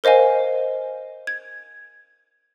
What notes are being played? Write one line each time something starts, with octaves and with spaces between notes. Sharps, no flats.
A#4 C5 D#5 F5 G#5
G#6